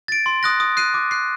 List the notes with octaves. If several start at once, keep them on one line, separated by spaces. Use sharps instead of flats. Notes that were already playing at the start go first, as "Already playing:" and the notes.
A6 D7
C6
D#6 F#6 A#6
D#6
F#6 C7 D#7
D6
F#6 C7